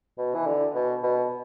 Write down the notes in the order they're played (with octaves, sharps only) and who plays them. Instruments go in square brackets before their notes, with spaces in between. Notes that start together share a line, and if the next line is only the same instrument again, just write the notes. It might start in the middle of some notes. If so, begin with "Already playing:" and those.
[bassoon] B2
E3
D3
B2
B2